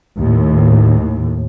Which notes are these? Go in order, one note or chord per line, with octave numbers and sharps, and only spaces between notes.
D#2 A2